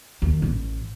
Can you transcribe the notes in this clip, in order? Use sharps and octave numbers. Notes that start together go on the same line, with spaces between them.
D#2
A1